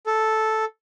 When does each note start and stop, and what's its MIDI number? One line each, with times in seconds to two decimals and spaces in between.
0.06 0.65 69